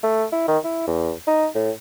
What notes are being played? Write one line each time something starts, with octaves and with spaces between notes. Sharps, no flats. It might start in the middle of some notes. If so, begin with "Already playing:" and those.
A3
E4
D#3
E4
E2
D#4
A2